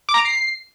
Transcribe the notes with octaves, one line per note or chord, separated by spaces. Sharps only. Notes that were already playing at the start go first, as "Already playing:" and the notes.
D6
A#5
D7
C7